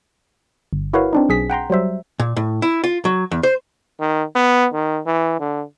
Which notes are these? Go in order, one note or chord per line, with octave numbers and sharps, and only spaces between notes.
G1
E4 F#4 A#4 B4 C#5 F5
C4 D4 D#4
B1 G#4 B6
F#5 G5 A#5 C6
F#3 G3 C5 E5
A#2
A2
E4
F4
F#3
E2
C5
D#3
B3
D#3
E3
D3